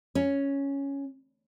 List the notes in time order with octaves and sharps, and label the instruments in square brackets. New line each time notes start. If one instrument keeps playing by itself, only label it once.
[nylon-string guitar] C#4